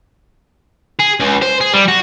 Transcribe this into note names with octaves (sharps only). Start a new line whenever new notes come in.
G#4
C#2
C5
G#4
G3
F#4